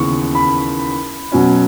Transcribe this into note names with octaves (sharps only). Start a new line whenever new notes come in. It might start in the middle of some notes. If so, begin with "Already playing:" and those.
Already playing: D#2 C#3 E3 B3 C#6
B5
B2 F#3 C#4